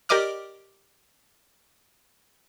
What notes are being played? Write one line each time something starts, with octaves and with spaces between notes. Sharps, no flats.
G4 A#4 D5 D#5 D6 F6